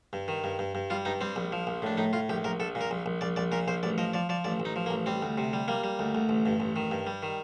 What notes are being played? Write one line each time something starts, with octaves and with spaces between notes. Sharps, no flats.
G2
D#3
G2
G2
G2
G3 F4
G2 D#4
G3 C4
A#1
F3
A#1
A2 D4
A2 D#4
A2 F4
A#1 G4
A#1 A#4
A#1 A4
A#2
A#4
A#1
A#1
A#1 D5
A#1 D5
A#2 A#4
A#1 C5
A1 D5
F3 D#5
F3 D5
F3 D5
A1 D5
A1
D#4
F3
A#3
A1
G3 C4
D2
C3
G3
G3 A#3
G3
D2
D2
A1
G2
A1
D#3
G2
G3
D#3